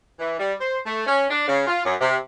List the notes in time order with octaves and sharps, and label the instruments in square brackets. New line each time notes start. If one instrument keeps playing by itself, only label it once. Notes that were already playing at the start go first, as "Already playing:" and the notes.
[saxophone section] E3
G3
C5
A3
C#4
D4
C#3
F4
F#2
C3